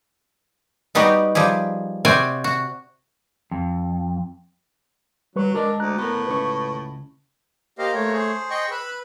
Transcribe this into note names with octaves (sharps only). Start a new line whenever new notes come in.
G3 B3 D#4 F#4 G4
F3 G3 G4 G#4
C3 F#4 C5 D5 G5 G#5
F#4
F2
F#3 G3 B4 C#6
G#3 D4 A#4 D#5 A5
D2 A#5 F#6
A2 B3 A#4
C#2 C#4 B4 C#6
A#3 G4 A#4 C5 D#5 F5
A3 C#5
G#4 C5
D#5 G5 C#6
B4 B5 E6 F#6